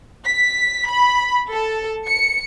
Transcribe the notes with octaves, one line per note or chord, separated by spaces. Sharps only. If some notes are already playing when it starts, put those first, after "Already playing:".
B6
B5
A4
C#7